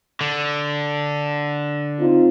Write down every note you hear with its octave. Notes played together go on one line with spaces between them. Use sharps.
D3
C4 D#4 F4